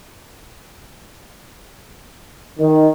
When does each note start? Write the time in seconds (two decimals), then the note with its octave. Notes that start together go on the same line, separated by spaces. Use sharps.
2.59 D#3